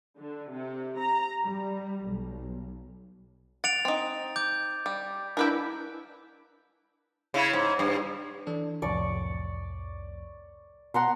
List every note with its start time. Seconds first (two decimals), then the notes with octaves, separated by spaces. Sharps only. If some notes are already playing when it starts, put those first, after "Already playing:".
0.18 D3
0.53 C3
1.00 A#5
1.42 G3
2.08 B1
3.64 F#5 A6 D7 F7
3.85 C4 D#4
4.36 D6 G6
4.86 G3
5.37 D4 E4 A#4 B4 G5
7.34 C#3 E4
7.53 G#2
7.79 G2
8.47 E3 D4 A4
8.82 C2 F2 A2 D5 C#6
10.94 B2 F#5 A#5 C6